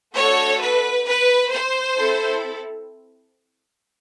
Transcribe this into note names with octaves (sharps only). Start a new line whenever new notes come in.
A3 D4 F#4 A4 C#5
B4
B4
C5
C4 E4 A4